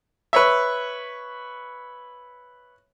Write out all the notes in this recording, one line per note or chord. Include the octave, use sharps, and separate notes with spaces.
B4 C#5 E5